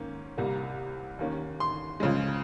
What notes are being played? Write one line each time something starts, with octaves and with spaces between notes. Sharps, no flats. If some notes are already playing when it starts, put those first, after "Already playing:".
Already playing: G#2 D#3 A#3 C#4
C2 C3 G3 A#3
D#2 D#3 A#3 C#4
C6
C#2 C#3 F3 G#3